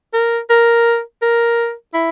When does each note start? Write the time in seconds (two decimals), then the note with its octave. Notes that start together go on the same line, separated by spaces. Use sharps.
0.14 A#4
0.49 A#4
1.22 A#4
1.94 E4